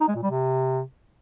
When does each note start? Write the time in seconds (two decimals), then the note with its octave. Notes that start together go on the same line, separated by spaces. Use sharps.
0.01 D#4
0.08 G#3
0.15 A#2
0.23 G3
0.30 C3